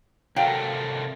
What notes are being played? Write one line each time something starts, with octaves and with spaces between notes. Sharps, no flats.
C3 F#3 A4 A#4 F5 G5